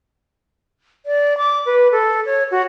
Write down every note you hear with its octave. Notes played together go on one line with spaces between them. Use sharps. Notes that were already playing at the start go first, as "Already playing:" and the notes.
D5
D6
B4
A4
C#5
F#4